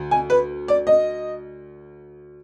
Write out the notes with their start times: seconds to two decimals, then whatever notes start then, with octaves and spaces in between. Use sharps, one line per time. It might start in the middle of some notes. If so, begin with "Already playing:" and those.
Already playing: D2
0.11 G#5
0.30 B4
0.68 D5
0.87 D#5